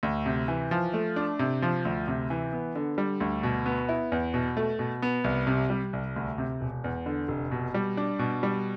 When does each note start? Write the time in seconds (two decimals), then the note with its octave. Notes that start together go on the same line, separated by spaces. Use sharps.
0.03 D2
0.26 C3
0.48 E3
0.71 F3
0.94 A3
1.16 D4
1.39 C3
1.62 F3
1.85 D2
2.08 C3
2.30 E3
2.53 B3
2.75 D3
2.98 G3
3.20 D2
3.43 B2
3.66 B3
3.89 E4
4.12 E2
4.34 B2
4.57 A3
4.79 B2
5.02 B3
5.24 C2
5.47 C3
5.70 G3
5.93 C2
6.16 D2
6.38 C3
6.61 E1
6.84 E2
7.06 D3
7.28 F1
7.51 B2
7.74 G3
7.97 D4
8.19 B2
8.43 G3